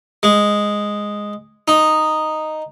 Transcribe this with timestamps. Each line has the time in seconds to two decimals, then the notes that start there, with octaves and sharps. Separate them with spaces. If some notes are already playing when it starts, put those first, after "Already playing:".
0.23 G#3
1.68 D#4